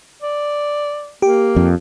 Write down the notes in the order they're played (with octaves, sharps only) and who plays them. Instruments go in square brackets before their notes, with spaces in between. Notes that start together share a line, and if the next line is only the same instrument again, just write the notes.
[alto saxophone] D5
[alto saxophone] A#3 [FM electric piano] G4
[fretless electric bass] F2